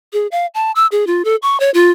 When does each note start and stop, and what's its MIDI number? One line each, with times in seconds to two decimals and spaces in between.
0.13 0.27 68
0.31 0.46 77
0.54 0.72 81
0.75 0.87 88
0.92 1.05 68
1.07 1.22 65
1.25 1.36 69
1.42 1.59 85
1.60 1.71 73
1.74 1.91 65